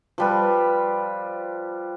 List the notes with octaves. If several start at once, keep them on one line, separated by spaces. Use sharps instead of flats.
F3 G3 B4